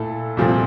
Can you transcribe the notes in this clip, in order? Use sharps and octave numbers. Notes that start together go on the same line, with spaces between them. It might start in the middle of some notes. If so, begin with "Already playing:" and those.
Already playing: A#2 A3 E4 A4
C2 A#2 F3 A3 C4